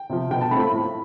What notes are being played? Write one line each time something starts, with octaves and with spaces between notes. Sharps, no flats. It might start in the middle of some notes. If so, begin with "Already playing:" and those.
Already playing: G5
C3 F3
B2 G5
A5
A3 C4 F4 B5
B5
A2